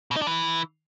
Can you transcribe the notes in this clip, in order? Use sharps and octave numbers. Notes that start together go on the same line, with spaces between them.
B2
D#4
D4
E3